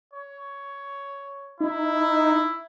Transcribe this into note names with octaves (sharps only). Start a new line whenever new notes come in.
C#5
D#4 E4